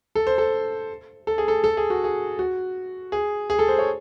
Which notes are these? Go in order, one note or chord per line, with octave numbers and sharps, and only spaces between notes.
A4
C5
A4
A4
G#4
A4
A4
G#4
F#4
G#4
F#4
G#4
G#4
A4
C5
C#5